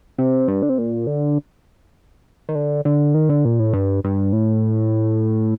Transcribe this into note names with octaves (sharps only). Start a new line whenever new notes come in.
C3
G2
D3
C3
A#2
D3
D#3
D3
D3
D#3
D3
A#2
A2
G2
G2
A2